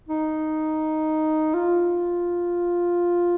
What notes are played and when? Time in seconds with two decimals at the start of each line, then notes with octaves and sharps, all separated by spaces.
0.09 D#4
1.54 F4